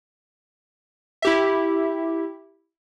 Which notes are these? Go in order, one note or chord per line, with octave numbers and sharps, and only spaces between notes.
E4 G4 E5